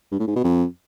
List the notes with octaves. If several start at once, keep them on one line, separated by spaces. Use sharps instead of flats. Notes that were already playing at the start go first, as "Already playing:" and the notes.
G2
A2
G#2
B2
F2